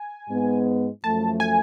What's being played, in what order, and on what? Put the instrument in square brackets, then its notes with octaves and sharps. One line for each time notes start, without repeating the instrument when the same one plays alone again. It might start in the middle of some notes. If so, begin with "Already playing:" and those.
Already playing: [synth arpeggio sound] G#5
[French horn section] G#2 G#3 B3
[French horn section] F#2 F3 A3 [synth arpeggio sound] A5
[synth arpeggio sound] G#5